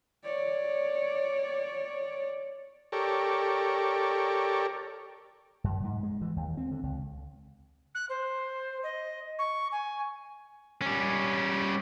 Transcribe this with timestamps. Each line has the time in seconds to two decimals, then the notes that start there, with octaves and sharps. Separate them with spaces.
0.24 C#5 D5
2.92 G4 A4 A#4 C#5 D5
5.64 F#2
5.84 G#2
6.03 G#3
6.22 E3
6.36 D#2
6.57 C4
6.71 D3
6.83 C#2
7.94 F#6
8.09 C5
8.83 D#5
9.38 C#6
9.71 G#5
10.82 G3 C#4